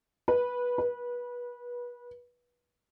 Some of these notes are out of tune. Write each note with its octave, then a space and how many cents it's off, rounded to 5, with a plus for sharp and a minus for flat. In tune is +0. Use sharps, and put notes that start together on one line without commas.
B4 -15
B4 -25